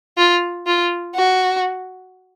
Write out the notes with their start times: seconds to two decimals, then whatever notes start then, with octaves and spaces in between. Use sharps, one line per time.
0.18 F4
0.67 F4
1.15 F#4